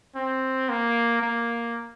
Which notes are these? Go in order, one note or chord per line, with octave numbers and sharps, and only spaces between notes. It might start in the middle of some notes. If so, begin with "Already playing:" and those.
C4
A#3
A#3